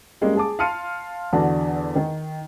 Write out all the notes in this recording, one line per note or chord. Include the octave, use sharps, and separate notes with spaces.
G3 G#3 A#3 C#4
G#4 A5 D6
F5 A5 C6 F6 C#7 D#7
E2 D3 D4 F#4 A5
D#3